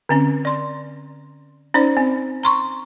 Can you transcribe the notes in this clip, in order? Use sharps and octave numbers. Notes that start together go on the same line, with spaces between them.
D3 C4 C#4
D5 C6
C#4 D#4 C5 D5
C4
A#5 C6 C#6